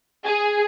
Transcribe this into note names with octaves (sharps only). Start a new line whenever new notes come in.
G#4